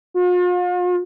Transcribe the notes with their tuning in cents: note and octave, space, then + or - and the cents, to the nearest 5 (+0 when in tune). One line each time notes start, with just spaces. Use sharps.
F4 +40